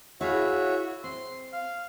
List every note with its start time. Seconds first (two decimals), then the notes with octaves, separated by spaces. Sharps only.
0.21 E4 F#4 G#4 C#5 E5 F5
1.04 C4 C6
1.53 F5